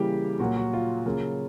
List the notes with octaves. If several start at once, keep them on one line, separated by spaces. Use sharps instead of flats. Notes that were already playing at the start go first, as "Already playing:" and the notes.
Already playing: C#3 E3 G3 A#3 G4
A#2 F#3 A#3 F#4
F#4
F4
C#3 F#3 A#3